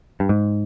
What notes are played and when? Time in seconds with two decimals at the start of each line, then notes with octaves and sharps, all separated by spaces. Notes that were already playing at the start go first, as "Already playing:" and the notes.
0.20 G2
0.29 G#2